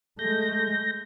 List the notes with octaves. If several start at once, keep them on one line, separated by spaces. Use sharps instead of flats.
G#3 A3 G6 A#6